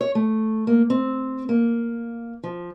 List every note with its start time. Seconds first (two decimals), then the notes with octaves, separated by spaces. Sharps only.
0.01 C#5
0.15 A3
0.67 A#3
0.90 C4
1.49 A#3
2.43 F3